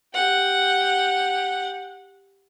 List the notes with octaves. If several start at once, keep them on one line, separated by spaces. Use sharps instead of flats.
G4 F#5